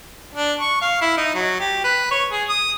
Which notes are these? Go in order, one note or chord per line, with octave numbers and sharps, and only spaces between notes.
D4
C#6
F5
E4
D#4
F#3
G4
B4
C#5
G#4
D#6